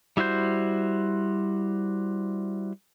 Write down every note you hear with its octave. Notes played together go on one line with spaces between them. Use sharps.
G3 E4 F#4 C5 G6